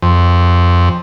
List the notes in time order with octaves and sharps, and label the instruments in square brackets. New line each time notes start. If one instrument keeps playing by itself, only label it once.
[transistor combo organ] F2